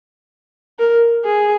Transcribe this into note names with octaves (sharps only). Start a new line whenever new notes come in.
A#4
G#4